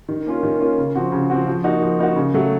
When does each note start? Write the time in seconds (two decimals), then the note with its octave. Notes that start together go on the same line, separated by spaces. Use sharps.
0.09 D#3
0.26 A#3 C#4 F4
0.43 D#3
0.60 A#3 C#4 F4
0.78 C#3
0.95 F3 C4 F#4
1.12 C#3
1.30 F3 C4 F#4
1.47 F3
1.64 A#3 D#4 F#4
1.81 F3
1.99 A#3 D#4 F#4
2.16 C#3
2.34 F#3 A3